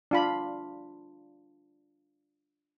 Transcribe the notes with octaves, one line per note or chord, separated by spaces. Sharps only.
D4 F4 B5